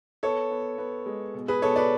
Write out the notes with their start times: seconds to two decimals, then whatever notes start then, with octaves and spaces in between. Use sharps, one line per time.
0.23 B3 A4 C#5
0.51 B3
0.78 B3
1.06 G#3
1.34 B2
1.48 G#4 B4
1.62 B2 A4 C#5
1.76 B4 D5